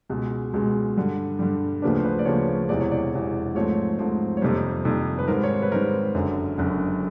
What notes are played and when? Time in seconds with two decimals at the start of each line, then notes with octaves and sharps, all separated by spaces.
0.09 C#2 B2 G#3
0.53 C#2 B2 G#3
0.97 G2 D3 G3
1.39 G2 D3 G3
1.82 D2 C#3 F3 A#3 D4 B4
1.99 C5
2.04 B4
2.19 D5
2.25 D2 C#3 F3 A#3 D4 C#5
2.69 E1 E2 C3 E3 D5
2.80 C#5
2.91 D5
3.12 E1 E2 C3 E3
3.55 G#2 F3 A3 C4 C#5
3.99 G#2 F3 A3 C4
4.37 C#5
4.41 F2 C3 D#3 G3 A#3 C5
4.85 F2 C3 D#3 G3 A#3
5.19 B4
5.28 G#2 D#3 G3 C4 A#4
5.44 C#5
5.53 C5
5.62 B4
5.72 G#2 D#3 G3 C4 A#4
6.15 F#1 F#2 D3
6.57 F#1 F#2 D3